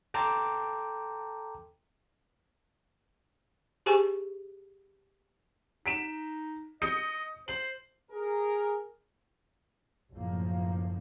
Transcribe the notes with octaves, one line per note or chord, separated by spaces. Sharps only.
A4 G5 A5 A#5 C6 D6
G4 G#4 C5 G#5 A5 C#6
D#4 B6 D7 E7
D#5 D#6 G6 C#7
C5 F#7
G#4 A#4
F#1 A2 F3 A3 A#3